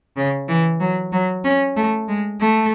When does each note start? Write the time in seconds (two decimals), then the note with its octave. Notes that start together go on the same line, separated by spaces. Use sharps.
0.17 C#3
0.49 E3
0.80 F#3
1.12 F#3
1.44 C#4
1.77 A3
2.08 G#3
2.41 A3